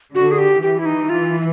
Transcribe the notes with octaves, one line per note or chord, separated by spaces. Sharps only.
D3 F#4
G#4
G4
E3 G4
E4
D#4
F4